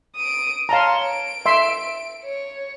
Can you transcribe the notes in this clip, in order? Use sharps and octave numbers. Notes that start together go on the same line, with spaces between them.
D#6 D7
C#5 F5 A5 A#5 C6
D7
E5 C6
C#5